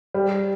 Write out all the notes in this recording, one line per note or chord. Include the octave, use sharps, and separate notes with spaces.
G3